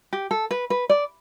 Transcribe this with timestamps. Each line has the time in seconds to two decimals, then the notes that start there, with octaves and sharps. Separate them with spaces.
0.13 G4
0.31 A4
0.51 B4
0.70 B4
0.89 D5